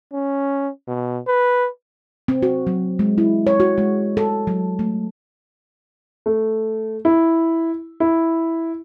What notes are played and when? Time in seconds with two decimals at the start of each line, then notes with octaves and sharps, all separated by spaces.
0.13 C#4
0.88 B2
1.27 B4
2.28 C4
2.42 F#4
2.67 F#3
2.99 G#3
3.18 E4
3.47 C#5
3.60 F#4
3.78 G#3
4.17 A4
4.47 F#3
4.79 A3
6.26 A3
7.05 E4
8.00 E4